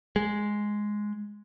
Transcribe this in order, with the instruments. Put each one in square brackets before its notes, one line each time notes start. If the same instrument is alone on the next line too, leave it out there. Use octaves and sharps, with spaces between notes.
[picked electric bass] G#3